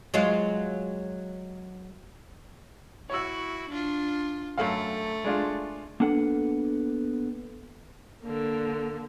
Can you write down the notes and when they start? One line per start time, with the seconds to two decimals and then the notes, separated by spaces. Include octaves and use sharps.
0.14 F#3 G#3 F4
3.10 E4 F#4 C#5 E6
3.70 D4 F4
4.58 F#2 A3 A4 F5
5.25 G#3 D4 F4
6.00 A#3 B3 D4 A4 F#5
8.24 D3 A#3